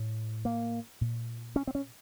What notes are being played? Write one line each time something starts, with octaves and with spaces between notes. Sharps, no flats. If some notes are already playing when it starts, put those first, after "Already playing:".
Already playing: A2
A#3
A#2
C#4
C4
C#4